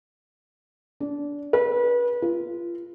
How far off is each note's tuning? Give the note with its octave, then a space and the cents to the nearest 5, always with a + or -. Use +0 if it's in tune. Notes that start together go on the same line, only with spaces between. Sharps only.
D4 -20
B4 -30
F4 -25